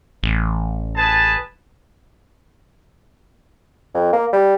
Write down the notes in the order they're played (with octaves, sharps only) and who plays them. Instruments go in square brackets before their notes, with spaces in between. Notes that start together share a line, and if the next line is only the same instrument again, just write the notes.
[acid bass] A1
[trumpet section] G#4 B4 A5
[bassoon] F2
A#3
G3